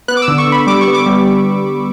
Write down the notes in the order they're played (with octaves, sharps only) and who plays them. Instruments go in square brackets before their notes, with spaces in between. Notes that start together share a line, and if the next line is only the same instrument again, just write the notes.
[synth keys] B3 F#6
D6
E6
D3
C#6
D3 B5
G3 D6
C#6
B3
D6
G3